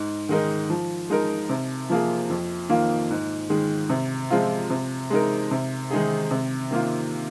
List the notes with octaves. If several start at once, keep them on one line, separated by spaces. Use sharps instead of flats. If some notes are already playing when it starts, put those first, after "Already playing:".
Already playing: G#2
D#3 G#3 D#4 A#4
F3
G#3 D#4 A#4
C3
F3 A#3 G#4
F2
D#3 A#3 F4
G#2
D#3 G#3
C3
F3 G#3 C4 F4
C3
G#3 D#4 A#4
C3
D#3 G#3 D#4 G#4
C3
D#3 A#3 F4